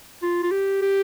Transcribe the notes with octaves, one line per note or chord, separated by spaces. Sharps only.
F4
F4
G4
G4